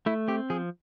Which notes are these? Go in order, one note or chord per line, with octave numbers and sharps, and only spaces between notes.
A3 E4
C4 G4
F3 G#4